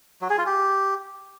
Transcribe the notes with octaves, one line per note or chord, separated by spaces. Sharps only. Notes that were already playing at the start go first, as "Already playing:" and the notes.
F#3
G#4
F4
G4